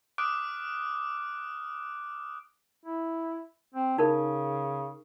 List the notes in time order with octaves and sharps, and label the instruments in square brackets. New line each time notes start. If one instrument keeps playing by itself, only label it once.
[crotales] D6 D#6 F6 F#6 D7
[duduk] E4
C4
[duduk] C#3 [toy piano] D#4 A#4